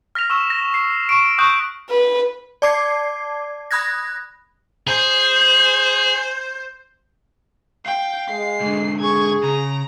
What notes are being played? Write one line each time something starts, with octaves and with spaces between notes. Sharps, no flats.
F6 A#6 B6 F7
C#6 E6 E7
A#6
C7
C#6 D7
C#6 D#6 F#6 G6
B4
D5 A5 D6 G#6 C7
B5 D#6 F#6 G#6 A#6
G#4 C5
F5 G5
G#3 C7
G#2 D3
G#4 C#6 G#6
C#3 A#5